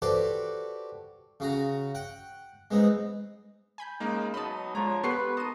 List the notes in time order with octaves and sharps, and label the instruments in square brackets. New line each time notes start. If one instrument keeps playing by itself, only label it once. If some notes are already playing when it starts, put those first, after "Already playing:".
[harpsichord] F#4 G4 A4 B4 C5 D5
C#3 F#4 A#5
F#5 G5
G#3 B3 C4 D#4
[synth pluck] G#5 B5 G6
[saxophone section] C#3 [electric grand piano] G#3 A#3 D#4
[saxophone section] B2 F#3 D#4 [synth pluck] D#5 A5 [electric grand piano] B5
[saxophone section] D3 F3 C#5 [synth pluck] G#3 [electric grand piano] A#5
[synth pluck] B3 G4 A4 [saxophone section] B4 [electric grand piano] C6 C#6 C7
[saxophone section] D#2 A#3 D#5 [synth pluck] A5 D#7